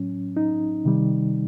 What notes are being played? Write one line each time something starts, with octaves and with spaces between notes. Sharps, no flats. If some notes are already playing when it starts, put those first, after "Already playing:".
Already playing: A2 F#3 C#4
D#4
C3 D#3 G3